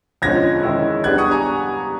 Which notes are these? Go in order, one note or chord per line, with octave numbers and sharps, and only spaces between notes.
F2 D3 F3 G#3 C#4 G#6 A#6
D#3 G#3 C#4 E4
G3 B3 D4 F#6 G#6
C#6 D#6
G#5 A#5